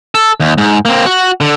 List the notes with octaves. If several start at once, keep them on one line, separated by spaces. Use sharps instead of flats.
A4
D#2
G#2
A#3 C4
F#4
D3